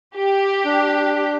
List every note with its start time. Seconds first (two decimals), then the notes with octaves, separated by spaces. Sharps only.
0.16 G4
0.65 D4